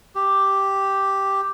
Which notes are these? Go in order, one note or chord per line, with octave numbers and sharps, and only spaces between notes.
G4